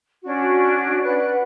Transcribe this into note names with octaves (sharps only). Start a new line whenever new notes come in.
C#4 D4 F#4
B4 D5 F#5 F#6